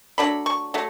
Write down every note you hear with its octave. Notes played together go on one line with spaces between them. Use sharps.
F#3 A3 D4 B5
C#6
F#3 A3